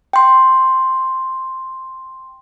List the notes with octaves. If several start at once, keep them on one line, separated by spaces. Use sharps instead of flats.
G5 C6